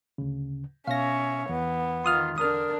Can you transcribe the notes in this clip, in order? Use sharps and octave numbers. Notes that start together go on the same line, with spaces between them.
D2 C#3
B2 C#4 C#5 E5 F5 A#6
E2 E3 B3
D#3 F4 C6 D#6 F6
D3 D4 A#4 D#6 F6